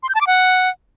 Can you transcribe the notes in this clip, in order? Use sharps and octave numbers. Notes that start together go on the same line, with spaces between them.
C6
G6
A5
D6
F#5